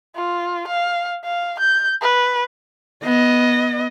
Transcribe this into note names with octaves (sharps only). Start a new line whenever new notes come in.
F4
F5
F5
G6
B4
B3 D#5